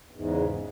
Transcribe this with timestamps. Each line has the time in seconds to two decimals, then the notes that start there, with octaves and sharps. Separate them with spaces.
0.11 E2
0.15 G#2
0.19 C#3